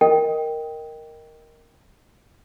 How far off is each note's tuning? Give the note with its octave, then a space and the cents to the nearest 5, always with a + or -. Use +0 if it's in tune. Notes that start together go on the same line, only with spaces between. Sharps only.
A#4 +0 D#5 +0 G5 +0